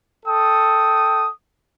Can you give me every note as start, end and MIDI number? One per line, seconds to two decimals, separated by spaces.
0.26 1.29 69
0.26 1.29 79
0.26 1.29 87